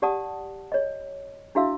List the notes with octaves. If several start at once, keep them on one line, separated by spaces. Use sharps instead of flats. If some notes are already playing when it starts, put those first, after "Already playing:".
G4 D5 F#5 A5 D#6
C#5 D#5
D4 E4 F#4 E5 F5 E6